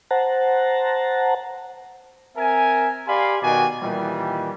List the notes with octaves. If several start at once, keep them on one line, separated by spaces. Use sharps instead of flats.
C5 F#5 A5 A#5
C4 A#4 E5 G#5
G4 D5 F5 G#5 B5 C6
B2 D#3 F#4 D5 G5 G#5
A#2 D#3 E3 G3